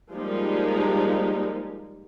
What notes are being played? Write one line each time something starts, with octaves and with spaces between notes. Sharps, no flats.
F3 G3 G#3 A#3 D#4 G4